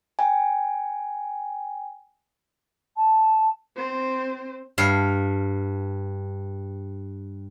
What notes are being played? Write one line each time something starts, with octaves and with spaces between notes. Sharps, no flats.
G5 G#5
A5
C4 C5
G2 F5